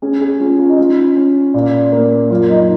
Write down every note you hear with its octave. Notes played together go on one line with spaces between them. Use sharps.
C#4 G#4
G#4
C#4 F4
F4
D#4
C#4 F4
C#4
A#2
A#3
F#2 F4
D#4